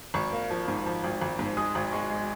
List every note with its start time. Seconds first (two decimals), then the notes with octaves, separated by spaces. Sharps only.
0.14 G#1 C#6
0.32 A#3
0.50 F3
0.68 G#2
0.86 F3
1.04 G#1
1.21 G#1
1.39 G#2
1.57 G#3 D#6
1.75 G#1
1.92 G#3 C#6
2.10 G#3